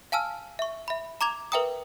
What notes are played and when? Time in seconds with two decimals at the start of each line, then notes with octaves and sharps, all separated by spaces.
0.12 F5 G#5 A5 E6 F6
0.59 E5 C#6
0.88 E5 B5
1.21 A#5 D6 G#6 F7
1.52 A#4 B4 E5 G5 A#5 D#6